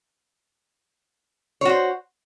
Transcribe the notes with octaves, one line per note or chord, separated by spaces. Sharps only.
F#4 C5 C#5